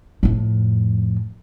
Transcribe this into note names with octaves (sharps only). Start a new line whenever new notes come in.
F2 A2